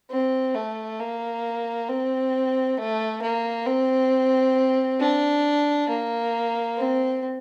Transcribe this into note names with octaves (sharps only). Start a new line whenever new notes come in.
C4
A3
A#3
C4
A3
A#3
C4
D4
A#3
C4